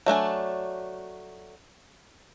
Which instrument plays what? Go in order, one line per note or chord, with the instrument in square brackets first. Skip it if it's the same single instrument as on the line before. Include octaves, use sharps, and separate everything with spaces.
[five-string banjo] F#3 A3 D4 G#5